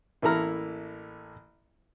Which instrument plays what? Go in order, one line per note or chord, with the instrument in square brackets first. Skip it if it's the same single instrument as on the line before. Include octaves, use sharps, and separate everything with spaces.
[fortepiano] A1 A#3 E4 A4 A#5 F6